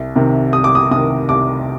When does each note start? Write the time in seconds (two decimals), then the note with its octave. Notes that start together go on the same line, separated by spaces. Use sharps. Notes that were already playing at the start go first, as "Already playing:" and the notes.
Already playing: C2
0.15 C3 D#3
0.53 C2 D#6
0.64 D6
0.75 D#6
0.91 C3 D#3 D#6
1.29 C2 D6